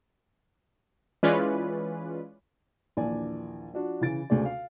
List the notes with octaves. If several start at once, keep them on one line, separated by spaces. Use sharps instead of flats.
E3 G#3 C#4 F4 B4 D5
A#1 D#2 E3 D4 D5 G#5
F3 D4 F#4
C#3 E3 A6 D7
D2 C#3 A3 G#4 D5
F5